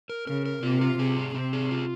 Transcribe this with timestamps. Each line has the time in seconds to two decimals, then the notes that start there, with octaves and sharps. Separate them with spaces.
0.09 A#4
0.27 C#3 A#4
0.45 A#4
0.63 C3 F4
0.81 F4
0.99 C3 G#4
1.17 C4
1.34 C3 C4
1.53 G#4
1.71 F4